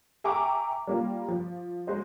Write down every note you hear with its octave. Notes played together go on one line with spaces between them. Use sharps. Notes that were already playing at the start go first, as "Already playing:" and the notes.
E5 G5 G#5 A#5 C#6 D6
G3 A#3 F4
F3
G#3 F#4 C5 D#5